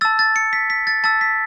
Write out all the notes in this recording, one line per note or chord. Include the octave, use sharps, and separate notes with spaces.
A5 E6 A6
A6
C#7
B6
B6
A6
A5 E6 A6
B6